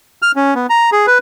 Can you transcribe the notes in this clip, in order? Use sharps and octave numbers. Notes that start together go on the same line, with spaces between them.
F6
C#4
B3
A#5
G#4
B4